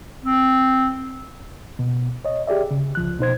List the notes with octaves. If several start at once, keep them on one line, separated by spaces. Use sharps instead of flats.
C4
B2
C#5 D#5
G4 G#4 D5 E5
C#3
C#2 F3 F#6
B2 D#4 C5 G#6